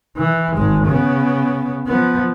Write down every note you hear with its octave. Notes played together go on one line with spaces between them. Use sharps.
E3
G#1 G#3
C#3 B3
F3 B3